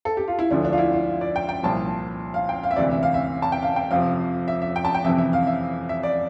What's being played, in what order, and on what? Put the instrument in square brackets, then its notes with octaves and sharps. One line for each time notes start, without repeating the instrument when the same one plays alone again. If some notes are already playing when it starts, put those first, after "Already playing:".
[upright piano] A4
G4
F4
E4
D2 D3 F3 D4
D4
F4
E4
F4
D5
G5
G5
C2 A#2 F3 A5
F5
G5
F5
E5
D2 C3 E3 D5
E5
F5
E5
A5
G5
F5
G5
F2 C3 F3 F5
E5
E5
G5
A5
G5
F2 C3 E3 E5
E5
F5
E5
E5
D5